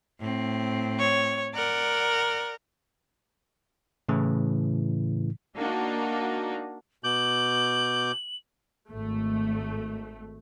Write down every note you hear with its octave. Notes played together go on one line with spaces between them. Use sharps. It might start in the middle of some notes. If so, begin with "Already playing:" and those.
A2 C4
C#5
A#4 D5 F#5
A2 C#3 E3
A#3 D4 D#4 F#4
B2 D6 G6 F#7
G#1 A3